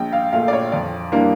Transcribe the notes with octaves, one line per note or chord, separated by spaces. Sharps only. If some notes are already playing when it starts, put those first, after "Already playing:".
Already playing: A#1 G5
F5
A#2 A3 F5
D5
C#5
F2 D5
E3 G3 A#3 D4